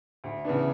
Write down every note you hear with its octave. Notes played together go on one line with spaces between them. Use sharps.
D2
C#3 E3 B3 D4